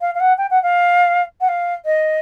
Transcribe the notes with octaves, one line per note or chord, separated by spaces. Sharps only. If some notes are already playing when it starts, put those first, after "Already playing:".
F5
F5
F#5
G5
F#5
F5
F#5
F5
D#5